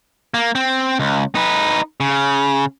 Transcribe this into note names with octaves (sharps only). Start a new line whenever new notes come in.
A#3
C4
C#2
D#4 B4
C#3